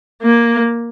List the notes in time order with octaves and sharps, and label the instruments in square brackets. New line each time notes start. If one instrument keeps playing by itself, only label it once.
[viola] A#3